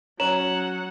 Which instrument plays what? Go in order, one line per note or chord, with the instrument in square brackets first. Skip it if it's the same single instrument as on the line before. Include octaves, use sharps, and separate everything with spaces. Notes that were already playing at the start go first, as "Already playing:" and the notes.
[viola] F#3 F#5 [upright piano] C#4 [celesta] A#5 E7 F#7